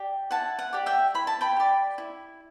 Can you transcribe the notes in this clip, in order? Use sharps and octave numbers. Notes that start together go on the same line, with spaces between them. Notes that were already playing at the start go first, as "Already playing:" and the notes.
Already playing: G4 D5
E4 F#5 A5
F#5
G4 D5
E5 G5
E4 B5
A5
G5 B5
G4 D5
E4